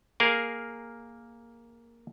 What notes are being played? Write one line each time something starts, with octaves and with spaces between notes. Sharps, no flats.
A#3 G#4 A#4 F5